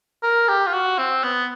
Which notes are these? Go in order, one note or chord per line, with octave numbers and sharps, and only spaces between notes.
A#4
G4
F4
F#4
C4
B3